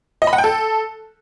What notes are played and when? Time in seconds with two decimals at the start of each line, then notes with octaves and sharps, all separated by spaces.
0.22 D#5
0.27 B5
0.33 F#5
0.38 G5
0.44 A4